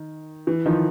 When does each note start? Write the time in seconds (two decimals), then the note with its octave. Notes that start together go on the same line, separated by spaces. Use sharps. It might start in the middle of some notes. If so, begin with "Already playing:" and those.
Already playing: D#3
0.47 E3
0.66 D#3 F3